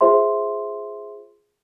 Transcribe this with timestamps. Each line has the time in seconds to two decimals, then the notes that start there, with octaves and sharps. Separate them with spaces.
0.01 F4 G#4 C5 E5 C6